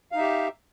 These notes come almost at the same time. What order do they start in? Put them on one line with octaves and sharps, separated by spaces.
F5 D#4 E5 G4